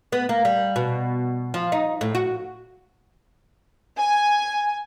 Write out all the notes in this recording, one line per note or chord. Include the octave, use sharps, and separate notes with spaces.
B3
A#3
G3
B2
F3
D#4
A2
F#4
G#5